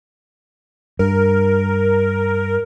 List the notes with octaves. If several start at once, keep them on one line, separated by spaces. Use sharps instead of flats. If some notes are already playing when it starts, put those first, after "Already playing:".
G2 A#4